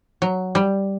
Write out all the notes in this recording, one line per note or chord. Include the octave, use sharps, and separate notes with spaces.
F#3
G3